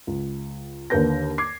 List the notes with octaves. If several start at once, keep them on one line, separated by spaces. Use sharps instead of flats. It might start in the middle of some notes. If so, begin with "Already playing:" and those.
C#2
D#2 D3 A#4 B4 G6 A#6
D6 G#6 C7